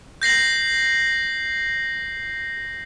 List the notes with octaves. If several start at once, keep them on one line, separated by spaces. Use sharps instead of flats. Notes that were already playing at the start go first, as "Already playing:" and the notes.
G6 A#6 C7 F#7